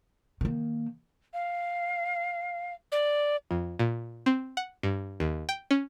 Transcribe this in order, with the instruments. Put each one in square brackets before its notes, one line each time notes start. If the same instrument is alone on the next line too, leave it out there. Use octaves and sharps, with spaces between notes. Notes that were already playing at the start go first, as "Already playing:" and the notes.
[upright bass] D#3 A#3
[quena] F5
[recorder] D5
[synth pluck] F2
A#2
C4
F#5
G2
D#2
G5
C#4